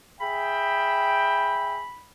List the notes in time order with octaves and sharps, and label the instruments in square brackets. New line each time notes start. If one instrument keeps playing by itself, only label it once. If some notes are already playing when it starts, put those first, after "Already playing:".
[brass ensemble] G#4 E5 G5 [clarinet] B5